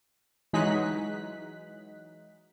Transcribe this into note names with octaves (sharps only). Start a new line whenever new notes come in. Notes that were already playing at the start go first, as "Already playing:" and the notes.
E3 F#3 G#3 D#4 F#6 B6